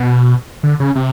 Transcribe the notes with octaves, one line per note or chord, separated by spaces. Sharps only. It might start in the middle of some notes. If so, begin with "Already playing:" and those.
Already playing: B2
D3
C#3
C3